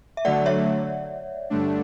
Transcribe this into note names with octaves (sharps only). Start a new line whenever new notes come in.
E5
D3 F#3 A3 D5 F#5
C#5 E5
G2 D3 A3 D4